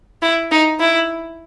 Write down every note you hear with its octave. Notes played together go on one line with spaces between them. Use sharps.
E4
D#4
E4